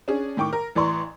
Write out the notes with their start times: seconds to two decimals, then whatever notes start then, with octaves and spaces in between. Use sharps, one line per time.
0.08 C#4 D4 G#4
0.37 A2 D#3 G5 C#6 D6
0.53 A#4
0.75 A1 E3 D5 A#5 C6 C#6